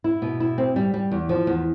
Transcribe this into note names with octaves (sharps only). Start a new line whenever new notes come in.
E4
B2
E4
C4
G3
G3
E2
F3
E2